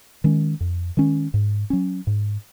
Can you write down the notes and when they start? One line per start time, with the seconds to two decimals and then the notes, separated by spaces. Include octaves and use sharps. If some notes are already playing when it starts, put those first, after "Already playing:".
0.24 D#3 G#3 C#4
0.60 F2
0.97 D#3 G#3 C#4
1.34 G#2
1.70 F#3 C#4
2.07 G#2